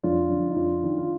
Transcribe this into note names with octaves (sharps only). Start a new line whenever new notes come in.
F2 D4 F4
D3 F3
D#4
F2 D4 F4
D#3
F4